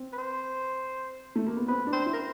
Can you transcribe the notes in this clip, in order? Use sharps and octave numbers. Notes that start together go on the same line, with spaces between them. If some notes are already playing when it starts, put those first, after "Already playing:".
Already playing: C4
B4
C5
A3
A#3
B3
C4 B4
D4
C5
E4
A#4